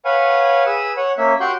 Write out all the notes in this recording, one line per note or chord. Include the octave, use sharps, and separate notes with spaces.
B4 C#5 F5 F#5 G#5
G#4 B4 D#6 E6
C#5 F#5
A#3 C#4 E5
F#4 G4 F#5 C6 C#6 G6